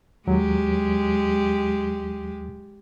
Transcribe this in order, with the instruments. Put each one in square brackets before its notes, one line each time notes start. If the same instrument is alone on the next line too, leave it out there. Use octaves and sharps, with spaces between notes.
[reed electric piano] D#2 F#3 [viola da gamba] G#3 G4